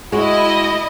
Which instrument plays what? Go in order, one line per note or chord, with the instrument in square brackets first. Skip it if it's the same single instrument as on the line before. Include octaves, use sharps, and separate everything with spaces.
[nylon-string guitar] G#3 F#4 [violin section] E4 D#5